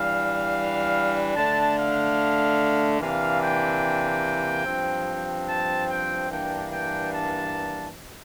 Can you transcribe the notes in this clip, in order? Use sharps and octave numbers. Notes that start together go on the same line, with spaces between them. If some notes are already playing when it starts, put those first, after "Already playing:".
Already playing: E3 G3 D4 F5
D3 A3 D4 A5
F5
C3 E3 A#3 D4 F5
G5
G2 F3 C4
A5
G5
G2 E3 A#3 D4 G5
G5
A5